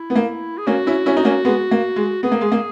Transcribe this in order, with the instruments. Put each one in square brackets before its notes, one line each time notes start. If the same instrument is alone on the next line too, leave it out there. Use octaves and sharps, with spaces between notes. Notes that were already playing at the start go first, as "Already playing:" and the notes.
Already playing: [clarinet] E4
[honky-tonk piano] B3
A#3
[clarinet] G#4
[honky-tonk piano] A#3 C#4 [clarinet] F#4
[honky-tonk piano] C#4 E4
C#4 E4
D#4
A#3 C#4
G#3 B3
A#3
G#3
[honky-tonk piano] B3 [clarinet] G#4
[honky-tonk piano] A#3
G#3
A#3